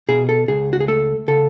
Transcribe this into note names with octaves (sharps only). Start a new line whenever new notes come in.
B2 G#4
A4
C#2 G#4
F#4
G#4
A3 A4
C#3 A4